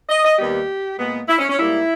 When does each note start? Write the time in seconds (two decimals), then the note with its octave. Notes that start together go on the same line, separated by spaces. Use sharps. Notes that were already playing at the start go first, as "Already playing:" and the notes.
0.09 D#5
0.24 D#5
0.39 D#2 D#3 G3 B3 G4
0.98 A#2 G#3 B3
1.29 E4
1.39 C#4
1.49 C#4
1.58 G#2 G3 A#3 E4